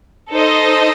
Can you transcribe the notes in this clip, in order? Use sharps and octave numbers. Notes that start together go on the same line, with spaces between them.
D#4 A4 C5 D#5